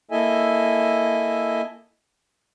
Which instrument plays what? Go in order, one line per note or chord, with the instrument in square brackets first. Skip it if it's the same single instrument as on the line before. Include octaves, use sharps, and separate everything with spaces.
[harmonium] A#3 E4 A4 D#5 E5 G#5